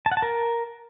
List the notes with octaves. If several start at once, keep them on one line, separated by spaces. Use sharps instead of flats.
A5
F#5
A5
A#4